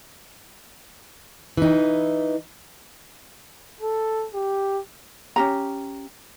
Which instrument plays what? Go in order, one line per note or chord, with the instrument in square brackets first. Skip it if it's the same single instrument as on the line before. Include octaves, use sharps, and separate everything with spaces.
[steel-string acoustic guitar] E3 D#4
[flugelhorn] A4
G4
[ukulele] C#4 G4 A#5